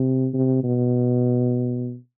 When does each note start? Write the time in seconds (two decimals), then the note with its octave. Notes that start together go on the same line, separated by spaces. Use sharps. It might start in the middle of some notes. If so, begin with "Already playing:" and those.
Already playing: C3
0.33 C3
0.63 B2